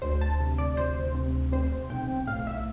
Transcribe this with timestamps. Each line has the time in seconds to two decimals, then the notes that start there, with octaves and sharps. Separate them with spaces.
0.02 D2 C5
0.21 A5
0.40 C3
0.58 D5
0.77 D2 C5
1.15 C3
1.52 C4 C5
1.90 B1 G5
2.27 A2 F5
2.47 E5